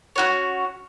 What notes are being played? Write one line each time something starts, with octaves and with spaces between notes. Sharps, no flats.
C#4 F#4 C#5